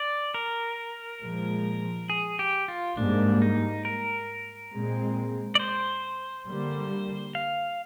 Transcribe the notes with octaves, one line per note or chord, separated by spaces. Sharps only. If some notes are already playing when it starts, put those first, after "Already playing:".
Already playing: D5
A#4
A#2 F3 G#3
G#4
G4
F4
G#2 G3 A#3 D4
D#4
A#4
A#2 G#3 C4
D5
C5
D3 G3 A#3
F5